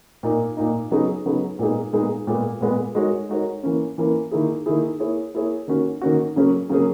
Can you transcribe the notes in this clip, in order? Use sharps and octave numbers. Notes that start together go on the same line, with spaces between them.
A#2 A#3 D#4
A#2 A#3 D#4
C#3 F#3 B3 D#4 G#4
C#3 F#3 B3 D#4 G#4
A#2 G#3 B3 D#4 G#4
A#2 G#3 B3 D#4 G#4
A#2 G#3 B3
A#2 G#3 B3
G#3 D#4 F#4 A#4 C#5
G#3 D#4 F#4 A#4 C#5
E3 A#3 C#4
E3 A#3 C#4
D#3 A#3 E4 G#4
D#3 A#3 E4 G#4
A#3 E4 G#4 C#5
A#3 E4 G#4 C#5
D#3 A#3 C#4 F#4
D#3 A#3 C#4 F#4
C#3 F#3 A#3 C#4 G#4
C#3 F#3 A#3 C#4 G#4